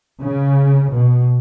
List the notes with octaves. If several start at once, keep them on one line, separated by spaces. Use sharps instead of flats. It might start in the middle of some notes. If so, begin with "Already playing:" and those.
C#3
B2